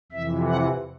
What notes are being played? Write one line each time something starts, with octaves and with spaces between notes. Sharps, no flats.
F2 C3 E3 E5
F#5